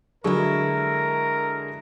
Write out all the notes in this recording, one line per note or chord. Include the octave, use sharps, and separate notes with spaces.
D3 F#3 G#3 E4 A#4 C#6